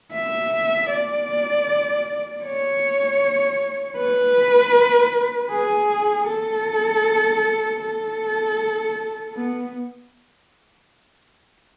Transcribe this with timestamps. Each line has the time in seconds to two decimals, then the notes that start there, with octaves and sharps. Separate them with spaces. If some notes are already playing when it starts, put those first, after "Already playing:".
0.13 E5
0.90 D5
2.44 C#5
3.97 B4
5.51 G#4
6.28 A4
7.82 A4
9.36 B3